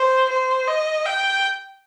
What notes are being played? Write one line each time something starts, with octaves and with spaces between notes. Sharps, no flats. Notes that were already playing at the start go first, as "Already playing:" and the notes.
Already playing: C5
C5
D#5
G5